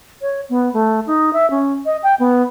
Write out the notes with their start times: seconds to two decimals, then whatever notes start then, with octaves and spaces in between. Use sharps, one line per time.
0.22 C#5
0.49 B3
0.73 A3
1.07 D#4
1.33 E5
1.50 C#4
1.86 D#5
2.03 G5
2.19 B3